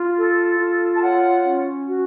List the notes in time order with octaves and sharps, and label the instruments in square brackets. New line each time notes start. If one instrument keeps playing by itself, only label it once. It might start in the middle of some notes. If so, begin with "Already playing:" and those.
Already playing: [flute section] F4
A4
F4
A5
C#5 F#5
C#4
F#4